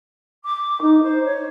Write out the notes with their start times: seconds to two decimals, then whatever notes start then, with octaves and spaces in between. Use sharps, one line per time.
0.44 D6
0.81 D#4
1.02 C5
1.24 C#5